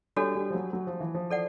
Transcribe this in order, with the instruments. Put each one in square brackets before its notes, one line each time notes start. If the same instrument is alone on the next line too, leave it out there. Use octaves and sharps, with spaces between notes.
[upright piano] G3 [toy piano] D4 F#4 A4 C#5
[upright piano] G3
F3
F#3
F#3
F3
E3
F3
[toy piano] A4 D5 F#5